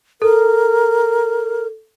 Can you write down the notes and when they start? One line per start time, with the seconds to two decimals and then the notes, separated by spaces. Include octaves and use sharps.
0.22 A4 A#4